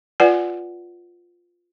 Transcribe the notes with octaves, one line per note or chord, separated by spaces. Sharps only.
F4 B4 D5 F#5 G#5